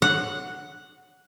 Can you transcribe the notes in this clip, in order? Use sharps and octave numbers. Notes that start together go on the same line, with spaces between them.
F#5